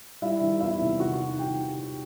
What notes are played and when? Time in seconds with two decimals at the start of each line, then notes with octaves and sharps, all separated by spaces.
0.22 G3 E4 E5
0.41 D#3
0.61 E2 E4 E5
0.81 C3
0.99 D#3 F#4 F#5
1.20 D#4
1.38 D#3 G4 G5